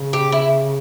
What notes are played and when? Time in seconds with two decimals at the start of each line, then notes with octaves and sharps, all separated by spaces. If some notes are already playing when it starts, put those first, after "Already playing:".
Already playing: C#3
0.13 G4
0.32 E4